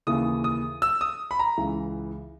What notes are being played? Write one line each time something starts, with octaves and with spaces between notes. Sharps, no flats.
D#2 C#3 E3 D#6
D#6
E6
D#6
B5
A#5
C#2 C#3 E3